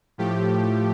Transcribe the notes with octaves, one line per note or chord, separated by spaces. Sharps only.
A2 F3 A3 G4